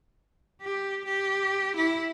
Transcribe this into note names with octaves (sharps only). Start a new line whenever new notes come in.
G4
G4
E4